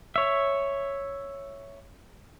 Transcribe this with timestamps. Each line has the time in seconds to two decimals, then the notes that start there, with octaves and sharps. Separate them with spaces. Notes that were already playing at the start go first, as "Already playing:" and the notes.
0.16 C#5 E5